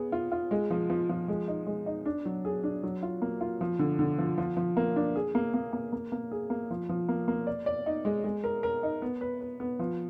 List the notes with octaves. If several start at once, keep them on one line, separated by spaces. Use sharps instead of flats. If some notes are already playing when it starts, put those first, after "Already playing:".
Already playing: B3 G#4
F4
F4
G#3
F3
F3
F3
G#3
D#4
G#3
D#4
D4
F#3
G#4
D4
F#3
F4
A#3
F4
F3
D3
D3
F3
F3
F3
A#3
D4
G#4
A#3
A#3
A#3
A#3
A#3
G#4
A#3
F3
F3
A#3
A#3
D5
D5
D#4
G#3
G#3
A#4
A#4
D#4
B3
B4
B4
B3
F3